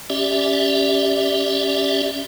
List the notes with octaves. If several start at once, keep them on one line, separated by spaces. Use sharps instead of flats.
C#4 G4 D5 E5